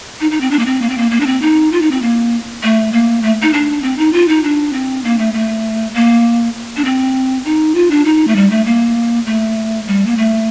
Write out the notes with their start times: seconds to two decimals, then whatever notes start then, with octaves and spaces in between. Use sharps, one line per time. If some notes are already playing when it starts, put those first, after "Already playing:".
0.21 D#4
0.31 D#4
0.41 C4
0.51 D4
0.59 A#3
0.66 C4
0.82 A#3
0.89 C4
0.98 A#3
1.11 A#3
1.20 D4
1.26 C4
1.42 D#4
1.72 F4
1.82 D#4
1.91 C4
2.02 A#3
2.63 A3
2.92 A#3
3.23 A3
3.42 D#4
3.53 D4
3.82 C4
3.98 D#4
4.13 F4
4.28 D#4
4.44 D4
4.73 C4
5.04 A#3
5.18 A3
5.34 A3
5.95 A#3
6.77 D4
6.85 C4
7.45 D#4
7.75 F4
7.91 D4
8.05 D#4
8.27 A3
8.36 G3
8.50 A3
8.66 A#3
9.26 A3
9.88 G3
10.06 A#3
10.17 A3